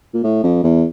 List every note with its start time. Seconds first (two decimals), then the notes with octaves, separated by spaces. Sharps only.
0.14 A#2
0.24 A2
0.43 F2
0.64 E2